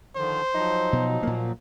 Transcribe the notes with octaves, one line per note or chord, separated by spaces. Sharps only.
D3 D#3 F3 C5
F3 F#3 D#4
B2
A#2 A#3